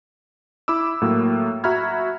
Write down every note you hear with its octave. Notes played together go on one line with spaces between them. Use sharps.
E4 B5 D6 E6
A2 F#3 A#3
F#4 E5 A#5 B5 F6 G#6